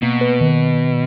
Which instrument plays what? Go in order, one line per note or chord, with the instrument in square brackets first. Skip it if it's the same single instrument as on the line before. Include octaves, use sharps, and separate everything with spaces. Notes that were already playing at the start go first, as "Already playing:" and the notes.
[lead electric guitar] B2 [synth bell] A#3
[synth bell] B4
D#3